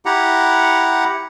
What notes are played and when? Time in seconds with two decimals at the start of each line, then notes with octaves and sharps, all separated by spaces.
0.06 E4 G4 F#5 A#5